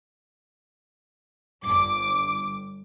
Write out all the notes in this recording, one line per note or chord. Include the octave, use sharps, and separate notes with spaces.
G1 D6